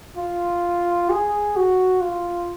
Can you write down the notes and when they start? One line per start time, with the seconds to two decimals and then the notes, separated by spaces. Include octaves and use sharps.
0.17 F4
1.10 G#4
1.56 F#4
2.01 F4